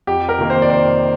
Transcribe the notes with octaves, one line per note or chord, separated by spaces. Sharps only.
F2 G4
A#4
C3 D#3 A#3
C5
D5
F2 C5